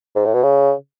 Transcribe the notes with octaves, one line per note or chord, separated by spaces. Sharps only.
G#2
A2
B2
C#3